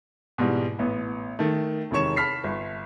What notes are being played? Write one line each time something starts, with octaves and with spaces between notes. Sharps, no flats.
G#2 B2 E3 G3
A1 B3
D#3 A3
E1 C3 D#3 C#5 C#6 E7
A5 B5 F6 B6 C7
G1